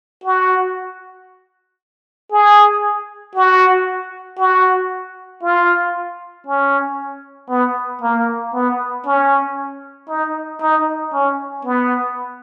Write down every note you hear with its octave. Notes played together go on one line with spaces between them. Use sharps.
F#4
G#4
F#4
F#4
F4
C#4
B3
A#3
B3
C#4
D#4
D#4
C#4
B3